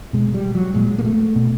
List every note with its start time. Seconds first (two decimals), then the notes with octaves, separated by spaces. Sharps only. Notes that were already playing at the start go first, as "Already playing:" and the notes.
0.13 B2 G#3
0.34 G3
0.55 F#3
0.74 A#2 G#3
0.98 A#3
1.05 A3
1.36 B2